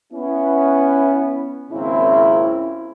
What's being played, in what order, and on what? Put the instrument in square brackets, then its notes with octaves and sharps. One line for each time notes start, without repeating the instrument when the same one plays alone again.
[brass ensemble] B3 C#4 E4
G#1 C#3 A#3 C4 C#4 E4